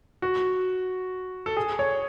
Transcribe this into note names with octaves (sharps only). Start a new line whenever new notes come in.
F#4
A4
G#4
C#5